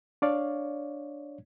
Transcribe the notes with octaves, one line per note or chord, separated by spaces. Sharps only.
D4 C#5 D5 F5